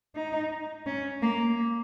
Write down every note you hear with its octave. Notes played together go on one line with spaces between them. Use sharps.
D#4
C#4
A#3